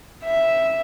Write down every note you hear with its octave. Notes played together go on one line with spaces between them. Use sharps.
E5